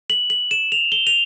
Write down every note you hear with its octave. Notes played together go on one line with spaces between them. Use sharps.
F#7
F#7
E7
F7
G7
F7